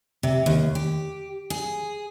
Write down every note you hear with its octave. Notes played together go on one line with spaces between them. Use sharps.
C3
D#2
G4
G#4